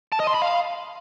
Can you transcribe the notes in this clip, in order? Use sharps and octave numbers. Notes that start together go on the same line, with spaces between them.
A5
D#5
C6
B5
F5